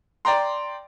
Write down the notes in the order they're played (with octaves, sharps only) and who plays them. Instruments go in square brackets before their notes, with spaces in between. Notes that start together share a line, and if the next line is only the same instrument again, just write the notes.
[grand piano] D5 G5 A#5 C6